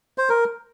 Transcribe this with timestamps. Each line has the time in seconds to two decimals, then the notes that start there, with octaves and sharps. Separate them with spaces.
0.18 C5
0.29 A#4